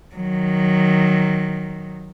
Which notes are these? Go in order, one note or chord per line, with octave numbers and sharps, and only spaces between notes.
D#3 F#3